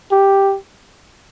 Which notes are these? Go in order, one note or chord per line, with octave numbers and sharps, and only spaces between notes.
G4